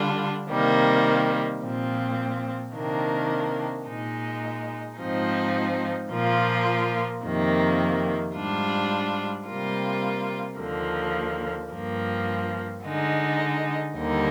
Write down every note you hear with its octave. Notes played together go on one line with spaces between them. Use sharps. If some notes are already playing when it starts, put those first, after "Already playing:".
Already playing: D3 G3 D4 F4
C3 D#3 G3 A#3
A#2 F3 C4
C3 D#3 A#3 D4
A#2 G#3 D#4
G#2 F3 C4 D#4
A#2 F3 A#3 F4
F2 C3 D#3 A#3
G#2 G3 D4 F4
C3 G3 A#3 F4
D#2 D3 F3 A#3
G2 F3 A#3
D3 G#3 D#4
D#2 D3 G3 A#3 D#4